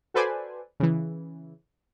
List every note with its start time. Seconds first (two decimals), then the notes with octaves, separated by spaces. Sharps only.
0.14 F#4 A4 B4 C5 D5 G#5
0.80 C#3 E3